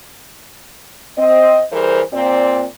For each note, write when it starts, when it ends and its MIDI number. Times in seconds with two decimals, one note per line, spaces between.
1.18 1.63 60
1.18 1.63 75
1.73 2.02 52
1.73 2.02 55
1.73 2.02 68
1.73 2.02 70
1.73 2.02 72
2.13 2.66 46
2.13 2.66 60
2.13 2.66 74